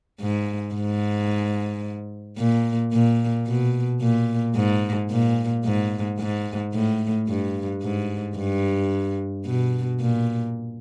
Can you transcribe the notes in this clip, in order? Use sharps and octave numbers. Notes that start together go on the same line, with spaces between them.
G#2
G#2
A#2
A#2
B2
A#2
G#2
A#2
G#2
G#2
A2
G2
G#2
G2
B2
A#2